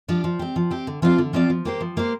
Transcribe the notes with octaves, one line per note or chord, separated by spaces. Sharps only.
F3 D4 G4
F3
C4 G4
F3
C4 G4
D3
F3 C4 F4 D5
D3
F3 C4 F4 D5
F3
A#3 G4 C5
F3
A#3 G4 C5